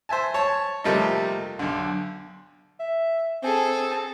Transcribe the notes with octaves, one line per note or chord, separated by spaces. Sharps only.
C5 E5 G#5 A5
C#5 A5
C3 F3 G3 A3 A#3 D#4
B1 D3
E5
C4 G#4 A4